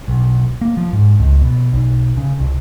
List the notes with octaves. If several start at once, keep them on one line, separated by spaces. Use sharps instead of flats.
B1
A#3
F3
G#2
C#2
B2
B1
C#3
C2